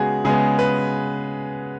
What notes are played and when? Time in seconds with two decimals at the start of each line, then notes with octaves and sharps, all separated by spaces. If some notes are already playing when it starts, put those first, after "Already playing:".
Already playing: C#3 G#3 B3 F#4 G#4
0.25 C#3 G#3 B3 G#4
0.59 B4